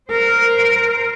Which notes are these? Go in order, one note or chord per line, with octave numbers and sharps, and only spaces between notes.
A#4 C5